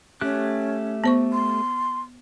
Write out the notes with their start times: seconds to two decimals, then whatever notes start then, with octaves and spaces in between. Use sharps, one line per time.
0.21 A3 C#4 G4 F#6
1.04 B3 C5 C#6
1.33 C6